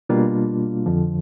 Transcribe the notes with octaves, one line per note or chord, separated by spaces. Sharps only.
B2 G3 A#3 D4 F4
F2 D3 F3